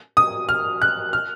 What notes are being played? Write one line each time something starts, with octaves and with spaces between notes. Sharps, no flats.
D#6
F6
F#6
F6